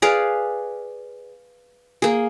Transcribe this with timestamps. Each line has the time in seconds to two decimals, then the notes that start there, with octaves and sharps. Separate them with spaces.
0.02 G#4 B4 D5 F5
2.02 A#3 G#4